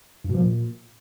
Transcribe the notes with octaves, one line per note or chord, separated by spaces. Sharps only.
G2
B2
F3
A#2